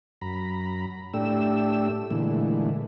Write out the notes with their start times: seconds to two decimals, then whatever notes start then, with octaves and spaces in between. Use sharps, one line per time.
0.21 F#2 A#5 B5
1.14 A2 A3 D4 G4 E6
2.11 A#2 D3 E3 G#3 A3